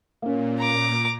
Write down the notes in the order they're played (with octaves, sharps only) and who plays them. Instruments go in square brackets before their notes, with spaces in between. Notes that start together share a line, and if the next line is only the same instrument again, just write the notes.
[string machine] A#2 [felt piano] A#3 C#4
[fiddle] A#5 D6